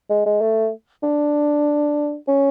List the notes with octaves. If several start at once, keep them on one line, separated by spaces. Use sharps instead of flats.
G#3
G#3
A3
D4
C#4